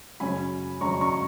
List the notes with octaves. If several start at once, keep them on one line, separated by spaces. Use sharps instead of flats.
F#2 C#3 F#3 C#4 G#5 B5
F#2 C#3 F#3 C#4 A#5 C#6
A#5 C#6